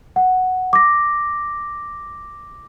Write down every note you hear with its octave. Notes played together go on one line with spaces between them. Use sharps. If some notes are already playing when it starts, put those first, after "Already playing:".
F#5
D6 A#6